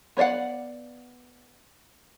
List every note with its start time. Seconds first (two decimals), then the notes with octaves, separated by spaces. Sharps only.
0.17 B3 C#5 D5 F5 F#5